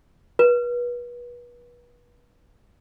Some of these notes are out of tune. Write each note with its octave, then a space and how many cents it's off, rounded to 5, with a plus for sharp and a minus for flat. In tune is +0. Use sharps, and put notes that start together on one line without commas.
B4 -35